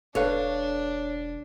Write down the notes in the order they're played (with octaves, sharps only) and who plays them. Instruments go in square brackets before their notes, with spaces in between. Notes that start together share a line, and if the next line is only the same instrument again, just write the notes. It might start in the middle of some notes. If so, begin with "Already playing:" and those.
[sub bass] E1 [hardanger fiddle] D4 [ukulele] A4 B4 F5 [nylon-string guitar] C#5